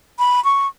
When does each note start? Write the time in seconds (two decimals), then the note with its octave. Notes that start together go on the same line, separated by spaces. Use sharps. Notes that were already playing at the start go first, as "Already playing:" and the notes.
0.19 B5
0.44 C#6